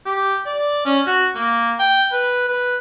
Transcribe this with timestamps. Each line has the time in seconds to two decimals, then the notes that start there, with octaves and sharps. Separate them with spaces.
0.06 G4
0.46 D5
0.85 C#4
1.07 F#4
1.35 A#3
1.80 G5
2.12 B4
2.49 B4